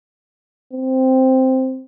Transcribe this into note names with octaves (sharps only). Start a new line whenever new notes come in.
C4